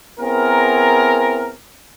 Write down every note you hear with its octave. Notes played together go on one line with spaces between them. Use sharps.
B3 C4 E4 G#4 A#4